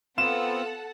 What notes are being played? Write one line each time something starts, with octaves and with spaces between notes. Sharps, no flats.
B3 C4 F4 A4 F#5 A5 E7